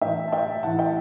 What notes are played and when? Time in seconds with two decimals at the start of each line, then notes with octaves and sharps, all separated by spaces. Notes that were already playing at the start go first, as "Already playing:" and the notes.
0.02 A2 E3 E5 G5
0.28 A5
0.32 E5 G5
0.63 A2 E3 F#5 A5
0.79 E5 G5